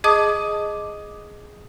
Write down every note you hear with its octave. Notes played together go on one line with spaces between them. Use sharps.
G#4 D#5 A5 D6 D#6